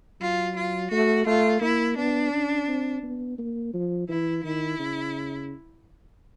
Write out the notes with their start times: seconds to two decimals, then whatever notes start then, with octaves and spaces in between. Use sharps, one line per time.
0.21 F#3 F4
0.56 F4
0.91 A3 F#4
1.26 A3 F4
1.61 A#3 E4
1.97 B3 D4
2.33 C#4
2.68 C4
3.03 B3
3.38 A#3
3.74 F3
4.09 E3 E4
4.44 D#3 E4
4.79 C#3